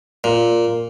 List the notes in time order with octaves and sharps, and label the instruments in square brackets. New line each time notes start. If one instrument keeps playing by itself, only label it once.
[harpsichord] A#2